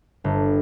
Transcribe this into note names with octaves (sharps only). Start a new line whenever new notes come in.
G1